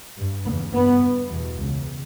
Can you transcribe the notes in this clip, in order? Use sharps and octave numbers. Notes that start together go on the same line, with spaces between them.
G2
E2 C#3 B3
G2 B3
G2
E2 B2
C#2 C#3